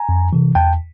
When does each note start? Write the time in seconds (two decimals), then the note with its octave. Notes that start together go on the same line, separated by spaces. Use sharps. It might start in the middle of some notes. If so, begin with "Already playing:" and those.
Already playing: G#5 A#5
0.09 F2
0.33 C3 E3
0.55 E2 G5 A5